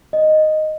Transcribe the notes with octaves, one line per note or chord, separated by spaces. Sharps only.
D#5